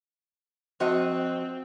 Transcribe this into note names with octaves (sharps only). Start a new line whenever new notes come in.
F3 C4 F#4 D#5